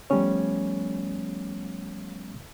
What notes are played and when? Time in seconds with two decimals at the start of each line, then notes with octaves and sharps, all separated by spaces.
0.10 F3 G3 A3 B3 C#4 C#5